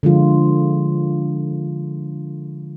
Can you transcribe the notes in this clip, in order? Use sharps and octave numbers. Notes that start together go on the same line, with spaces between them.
D3 F3 G#3 F4